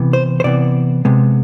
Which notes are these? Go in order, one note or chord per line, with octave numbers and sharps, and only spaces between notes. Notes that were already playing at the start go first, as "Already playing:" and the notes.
Already playing: C3 E3 B3
C5
C5
C3 E3 B3 D5
C3 G#3 B3